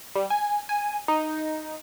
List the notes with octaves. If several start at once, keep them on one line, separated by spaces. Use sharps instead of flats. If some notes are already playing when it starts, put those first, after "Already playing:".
G3
G#5
G#5
D#4